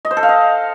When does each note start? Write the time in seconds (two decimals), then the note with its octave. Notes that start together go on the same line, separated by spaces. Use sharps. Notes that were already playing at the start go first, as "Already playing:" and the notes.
0.05 D#5
0.11 C5
0.17 A4
0.23 F5
0.29 D#5